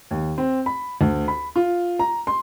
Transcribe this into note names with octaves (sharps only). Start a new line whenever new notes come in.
D#2
C4
B5
D2
B5
F4
A#5
C6